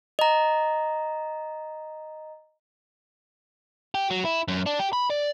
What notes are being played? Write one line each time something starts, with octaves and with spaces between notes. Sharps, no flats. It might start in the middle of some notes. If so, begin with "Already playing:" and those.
D#5 A#5
G4
F#3
E4
F#2
D4
G4
B5
D5